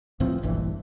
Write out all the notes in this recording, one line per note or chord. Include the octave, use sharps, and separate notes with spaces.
C#2 A2 F3 C4
F1 A#1 G2 E3